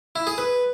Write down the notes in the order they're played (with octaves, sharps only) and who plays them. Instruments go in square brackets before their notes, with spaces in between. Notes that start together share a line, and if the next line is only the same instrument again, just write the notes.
[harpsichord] E4
G#4
B4